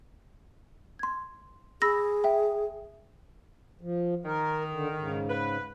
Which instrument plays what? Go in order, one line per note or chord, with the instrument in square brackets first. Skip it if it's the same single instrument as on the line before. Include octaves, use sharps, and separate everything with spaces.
[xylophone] C6 G#6
[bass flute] G#4 [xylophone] B5 E6 A#6
[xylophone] E5 G5
[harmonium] F3
[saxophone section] D#3 [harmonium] A#4
[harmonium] D3
G#2 C#3
[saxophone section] B4